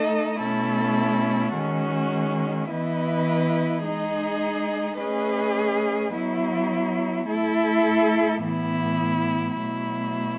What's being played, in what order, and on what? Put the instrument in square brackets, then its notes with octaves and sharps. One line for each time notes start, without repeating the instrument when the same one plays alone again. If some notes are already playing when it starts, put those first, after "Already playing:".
Already playing: [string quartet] A3 D#4 A4 D#5
B2 A3 C#4 E4 A4
D#3 G#3 C#4 F#4
E3 B3 E4 B4 D#5
G#3 D#4 G#4 D#5
A3 C#4 G#4 B4 D#5
F#3 B3 E4
A3 E4 A4
A2 E3 B3 E4
B2 F#3 A3 E4